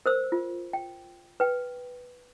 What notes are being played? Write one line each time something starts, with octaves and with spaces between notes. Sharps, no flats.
A#4 C5 E6
F4
G5
B4 G5